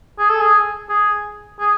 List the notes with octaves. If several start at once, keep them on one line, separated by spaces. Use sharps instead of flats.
G#4
A4
G#4
G#4
G#4